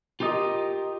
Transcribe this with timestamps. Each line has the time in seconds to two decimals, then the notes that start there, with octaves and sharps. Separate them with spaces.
0.20 F4 G4 A#4 D#5